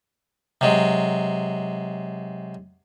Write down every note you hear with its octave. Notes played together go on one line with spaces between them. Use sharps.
C3 F#3 G#3